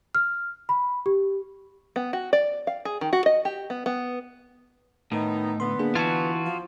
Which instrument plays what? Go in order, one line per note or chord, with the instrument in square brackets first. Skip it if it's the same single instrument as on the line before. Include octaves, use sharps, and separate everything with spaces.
[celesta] F6
B5
G4
[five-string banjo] B3
F#4
D5
F5
G#4
D#3
F#4
D#5
G4
B3
B3
[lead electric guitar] A2 [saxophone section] D#3 B3 D#4
[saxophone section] D3 B3 [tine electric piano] C6
[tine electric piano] A#3 D4 G#4
[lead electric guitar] E3 [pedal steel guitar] F4 F#4 [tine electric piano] A5 G#6 A6
[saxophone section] F3